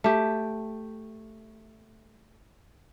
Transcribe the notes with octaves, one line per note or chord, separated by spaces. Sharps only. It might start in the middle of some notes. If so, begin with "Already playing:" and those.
A3 G4